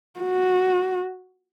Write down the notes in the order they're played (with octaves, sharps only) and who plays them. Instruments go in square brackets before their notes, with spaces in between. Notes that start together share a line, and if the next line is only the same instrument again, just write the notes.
[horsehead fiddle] F#4